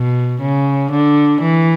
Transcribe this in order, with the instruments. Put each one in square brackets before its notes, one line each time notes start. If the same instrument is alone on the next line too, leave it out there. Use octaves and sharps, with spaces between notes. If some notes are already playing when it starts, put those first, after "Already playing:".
Already playing: [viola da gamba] B2
C#3
D3
E3